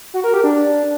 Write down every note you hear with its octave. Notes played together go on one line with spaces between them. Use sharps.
F#4
A#4
G4
D4